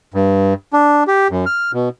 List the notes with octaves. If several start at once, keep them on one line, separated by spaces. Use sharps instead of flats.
G2
D4
G4
F#2
F6
B2